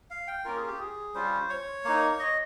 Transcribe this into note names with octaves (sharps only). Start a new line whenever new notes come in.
F5
G5
A#3 C#4 F4 A#4
G#4
G4
G#4
G3 C#4 F4 C5
C#5
A#3 D#4
D#5